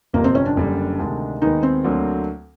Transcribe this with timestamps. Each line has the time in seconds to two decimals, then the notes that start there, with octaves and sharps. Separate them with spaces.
0.13 G1 F2 C3 A#3
0.24 C4
0.35 C#4
0.46 D4
0.56 F#1 F#2 D3 G3
0.99 D2 C3 D#3 G#3
1.42 D#2 D#3 G#3 B3 D#4
1.63 C4
1.85 D2 D3 F#3 A#3 D4